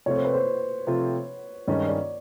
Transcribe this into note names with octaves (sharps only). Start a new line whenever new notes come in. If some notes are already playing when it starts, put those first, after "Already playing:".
C3 F3 A3 C4 F4 C#5
C5
B4
C5
C3 F3 A3 C4 F4
G2 D#3 G#3 C#4 C#5
D5